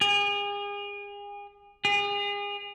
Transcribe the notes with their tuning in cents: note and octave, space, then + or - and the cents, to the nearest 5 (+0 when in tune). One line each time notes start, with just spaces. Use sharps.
G#4 -35
G#4 -35